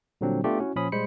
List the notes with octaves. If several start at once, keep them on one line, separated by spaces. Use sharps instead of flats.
A#2 D3 F#3 G3 C4 D4
A3 B3 D4 F4 G4
C#4 E4 F#4
A#2 F3 C#4 B5 D#6
A#2 G3 G#3 C5 B5 C#7